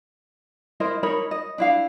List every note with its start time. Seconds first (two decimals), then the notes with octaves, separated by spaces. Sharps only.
0.80 E4 A#4 C5 D#5
1.03 D#4 A#4 C#5 B5
1.31 D#5
1.58 D4 E4 F5